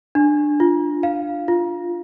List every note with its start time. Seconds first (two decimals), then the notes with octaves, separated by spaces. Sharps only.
0.15 D4
0.60 F4
1.03 F5
1.48 F4